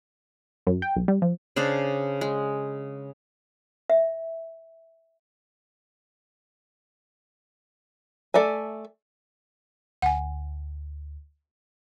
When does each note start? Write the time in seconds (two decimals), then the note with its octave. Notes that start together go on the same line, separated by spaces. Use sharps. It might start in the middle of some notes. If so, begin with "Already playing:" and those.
0.67 F#2
0.82 G5
0.96 B1
1.08 G3
1.22 F3
1.56 C#3 D4 C5
2.21 G#3
3.90 E5
8.34 A3 A4 D5 E5 G#5
10.02 D2 F#5 G#5